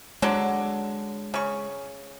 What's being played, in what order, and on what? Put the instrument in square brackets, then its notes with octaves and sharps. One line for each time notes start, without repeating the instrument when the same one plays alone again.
[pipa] D3 F#3 D4 [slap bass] G#3
[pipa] C#3 C#6